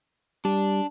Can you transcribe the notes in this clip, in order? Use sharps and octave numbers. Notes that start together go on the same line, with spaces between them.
G3 D4